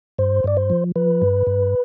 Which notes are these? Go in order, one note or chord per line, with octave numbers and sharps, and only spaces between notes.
G2 C5
G2 D5
C5
F3
F3 B4
G2
G2